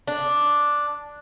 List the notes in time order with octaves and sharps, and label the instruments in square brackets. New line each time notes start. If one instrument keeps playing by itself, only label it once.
[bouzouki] D4